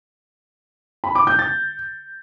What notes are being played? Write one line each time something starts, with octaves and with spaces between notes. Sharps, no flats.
B5
D6
G6
A6